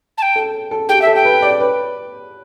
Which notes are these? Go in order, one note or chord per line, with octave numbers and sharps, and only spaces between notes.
A5
G5
A4
A4
G4 G5
E5
A4
G5
B4
D5
B4